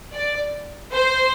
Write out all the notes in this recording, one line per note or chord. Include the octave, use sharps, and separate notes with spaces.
D5
C5